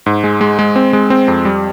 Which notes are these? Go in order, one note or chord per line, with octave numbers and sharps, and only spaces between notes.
G#2
G#3
G#3
G#3
C4
G#3
C4
F2
G3